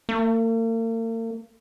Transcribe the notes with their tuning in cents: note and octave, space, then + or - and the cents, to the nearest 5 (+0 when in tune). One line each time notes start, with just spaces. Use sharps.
A#3 -45